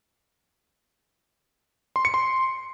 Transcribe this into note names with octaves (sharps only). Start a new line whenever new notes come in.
C6
C#7
C6